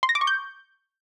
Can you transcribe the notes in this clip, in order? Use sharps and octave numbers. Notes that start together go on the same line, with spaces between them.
C6
A#6
D6
C#6
G6